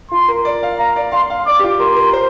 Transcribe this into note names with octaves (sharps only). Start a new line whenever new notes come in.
F4 C6
A#4
D5
F5
F5 A#5
D5
F5 C6
F5
D5 D6
G4
F4
A#4 C6
A#4
C5